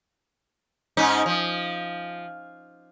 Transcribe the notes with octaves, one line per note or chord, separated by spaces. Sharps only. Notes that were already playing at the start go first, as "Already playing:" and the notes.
G#2 C#4 D#4
F3